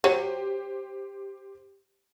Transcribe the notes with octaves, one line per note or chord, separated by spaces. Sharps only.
F#3 G4 C5 D#7